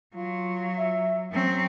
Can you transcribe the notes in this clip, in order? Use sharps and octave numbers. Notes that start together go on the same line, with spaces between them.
F#3 F4
E5
F#3 C4 C#4